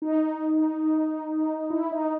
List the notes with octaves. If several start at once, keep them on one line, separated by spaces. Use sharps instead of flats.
D#4
E4
D#4